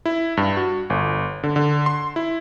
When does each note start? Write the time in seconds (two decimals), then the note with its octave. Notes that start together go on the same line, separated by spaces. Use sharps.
0.06 E4
0.37 G2
0.57 F#4
0.90 G1
1.43 D3
1.56 D3
1.86 C6
2.16 E4